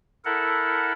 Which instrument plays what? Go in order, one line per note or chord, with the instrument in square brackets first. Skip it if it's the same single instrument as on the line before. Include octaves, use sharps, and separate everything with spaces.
[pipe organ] E4 A4 A#4 F#5